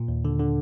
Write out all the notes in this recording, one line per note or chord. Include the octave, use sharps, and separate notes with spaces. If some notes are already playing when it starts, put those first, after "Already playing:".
Already playing: A#2
D#2
D3
D3